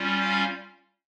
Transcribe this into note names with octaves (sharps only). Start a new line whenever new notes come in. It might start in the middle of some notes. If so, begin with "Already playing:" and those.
Already playing: G3 C#4 F4
F5